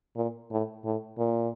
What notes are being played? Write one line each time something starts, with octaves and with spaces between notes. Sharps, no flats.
A#2
A2
A2
A#2